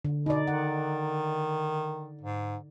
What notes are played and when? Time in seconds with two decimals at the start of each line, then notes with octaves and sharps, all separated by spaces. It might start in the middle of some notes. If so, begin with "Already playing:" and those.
0.05 D3
0.26 B2 D#4 D5
0.47 D#3 F#5
2.21 G#2